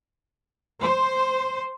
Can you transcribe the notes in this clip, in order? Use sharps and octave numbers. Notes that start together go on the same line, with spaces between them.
C5